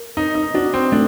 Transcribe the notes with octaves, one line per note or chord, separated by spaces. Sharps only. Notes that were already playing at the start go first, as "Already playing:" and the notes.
Already playing: A#4
D#4 D#5
D#4
D4 F#4
C4
A3 D4